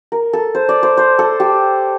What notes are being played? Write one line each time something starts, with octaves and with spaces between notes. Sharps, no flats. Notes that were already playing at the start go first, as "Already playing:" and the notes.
A#4
A4
C5
D5
C5
C5
A4
G4